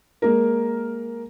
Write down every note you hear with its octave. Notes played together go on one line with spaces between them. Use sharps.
G#3 A#3 A#4